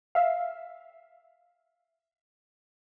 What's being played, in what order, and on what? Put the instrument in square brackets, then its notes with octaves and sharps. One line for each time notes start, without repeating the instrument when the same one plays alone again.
[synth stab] E5 F5